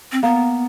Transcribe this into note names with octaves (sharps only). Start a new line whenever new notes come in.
C4
A#3 B3